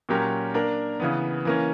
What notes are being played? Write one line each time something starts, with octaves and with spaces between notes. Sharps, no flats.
A#2 F#3 C#4 G4 A#4
A#3 D4 A#4
C#3 E3 B3
E3 A#3 C#4